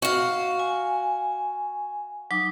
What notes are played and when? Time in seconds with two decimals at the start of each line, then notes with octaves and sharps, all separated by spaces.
0.02 F#4 F5
0.59 G#5
2.31 F#3 D#4 D6